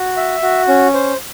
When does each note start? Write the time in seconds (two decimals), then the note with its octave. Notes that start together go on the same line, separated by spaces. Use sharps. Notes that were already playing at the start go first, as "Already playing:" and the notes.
Already playing: F#4
0.17 E5
0.43 F#4
0.68 C#4
0.94 C5